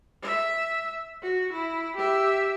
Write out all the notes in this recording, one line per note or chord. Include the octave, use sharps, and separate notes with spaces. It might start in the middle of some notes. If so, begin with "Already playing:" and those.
E5
F#4
E4
G4 E5